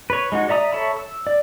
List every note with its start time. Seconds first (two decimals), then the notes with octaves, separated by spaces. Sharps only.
0.10 B4 C#5
0.32 G#3 D#4 F#4
0.49 D5 E5 A#5 D#6
0.72 A4 C#5 E5 B5
0.97 E6
1.27 D5